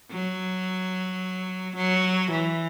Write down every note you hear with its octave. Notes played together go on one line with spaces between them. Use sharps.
F#3
F#3
E3